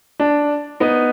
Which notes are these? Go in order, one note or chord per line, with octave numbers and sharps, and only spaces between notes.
D4
B3 D#4